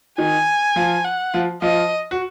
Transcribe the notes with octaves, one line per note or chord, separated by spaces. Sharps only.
D#3 D#4 G#5
F3 F4
F#5
F3 F4
F3 F4 D#5
F#4